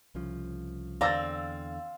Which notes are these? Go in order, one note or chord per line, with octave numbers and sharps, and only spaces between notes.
C2 C#3 F3
E2 D3 C4 D5 F5 A#5 E6 A6